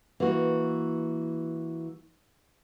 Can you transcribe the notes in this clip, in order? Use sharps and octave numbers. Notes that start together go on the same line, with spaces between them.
E3 A#3 F#4